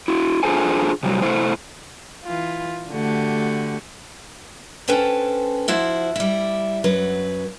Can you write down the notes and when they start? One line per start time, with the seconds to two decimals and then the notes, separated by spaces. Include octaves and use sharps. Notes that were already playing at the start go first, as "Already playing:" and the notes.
0.08 E4 F#4
0.43 D4 F4 G#4 A4 C5 G#5
1.03 C3 F#3 G3
1.22 C3 A3 E4 C5
2.24 E3 F4
2.90 D3 A3 F#4 G4
4.88 C#4 A4 B4 C5 G5 A5
5.68 F3 E4 F#4 C5
6.16 G3 E4
6.84 F#2 F#3 B4